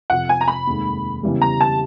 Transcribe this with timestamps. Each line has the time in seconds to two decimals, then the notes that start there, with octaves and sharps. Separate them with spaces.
0.10 F2 C3 F3 F#5
0.29 G#5
0.41 A#5
0.48 B5
0.67 F1 D#2 D#3 G#3
1.23 E2 C#3 E3 G3
1.42 A#5
1.61 A5